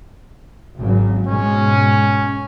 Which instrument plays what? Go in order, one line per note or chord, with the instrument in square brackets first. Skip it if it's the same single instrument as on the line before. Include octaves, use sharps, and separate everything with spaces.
[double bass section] G#1 C#3 F#3
[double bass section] G#2 B2 G#3 [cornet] C#4